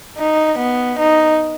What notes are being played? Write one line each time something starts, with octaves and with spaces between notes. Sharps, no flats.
D#4
B3
D#4